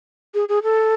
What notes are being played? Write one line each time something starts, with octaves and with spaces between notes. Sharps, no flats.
G#4
G#4
A4